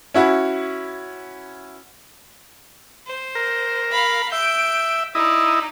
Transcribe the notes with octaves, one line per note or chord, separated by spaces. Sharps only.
C#4 E4 F#4
C5
A#4
F5 B5
E5 G6 D7
D#4 E4 D5 D#5